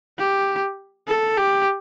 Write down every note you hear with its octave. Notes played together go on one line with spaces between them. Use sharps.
G4
A4
G4